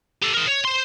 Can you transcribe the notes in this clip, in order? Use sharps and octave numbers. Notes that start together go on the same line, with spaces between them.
G4 A4
G#4 A#4
C#5
C5 C6